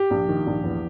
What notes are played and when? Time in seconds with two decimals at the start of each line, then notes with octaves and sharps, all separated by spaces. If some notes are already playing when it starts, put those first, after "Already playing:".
Already playing: G4
0.11 A#1
0.28 D#3
0.47 A#1
0.63 E2